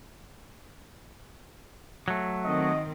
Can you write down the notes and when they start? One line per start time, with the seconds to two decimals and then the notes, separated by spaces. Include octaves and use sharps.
2.08 F#3 A3
2.45 D#3 C4 F#4 D#5